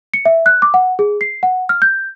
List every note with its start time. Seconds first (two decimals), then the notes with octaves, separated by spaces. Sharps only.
0.14 C#7
0.25 E5
0.46 F#6
0.62 D6
0.74 F#5
0.99 G#4
1.21 C7
1.43 F#5
1.69 F6
1.82 G6